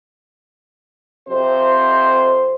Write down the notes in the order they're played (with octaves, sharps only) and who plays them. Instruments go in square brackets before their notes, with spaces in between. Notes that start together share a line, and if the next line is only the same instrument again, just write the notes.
[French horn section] F2 C3 C5